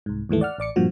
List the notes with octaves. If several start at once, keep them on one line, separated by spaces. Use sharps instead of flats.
C2 G#2
D#2 G#2 E3 A3
D5 F#5 F6
A1 D5 D6 C#7
G2 A#2 F3 F#4